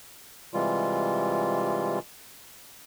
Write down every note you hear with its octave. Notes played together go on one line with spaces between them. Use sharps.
C3 E3 G3 G#3 F4